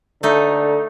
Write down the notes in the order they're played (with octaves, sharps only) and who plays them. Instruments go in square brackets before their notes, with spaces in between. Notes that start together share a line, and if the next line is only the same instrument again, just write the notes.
[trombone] D3 [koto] A3 D#4 [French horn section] A4